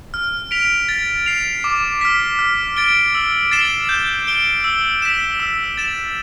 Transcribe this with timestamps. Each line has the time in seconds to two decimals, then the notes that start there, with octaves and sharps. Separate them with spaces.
0.14 F6
0.51 B6 D7 F7
0.89 A6
1.26 C7 F7
1.64 D6
2.01 F6 B6
2.39 F6
2.76 A6 D7 G7
3.15 E6
3.51 A6 C7 E7 G7
3.89 G6
4.27 D7 G7
4.64 E6
5.02 B6 E7
5.40 E6
5.77 A6 E7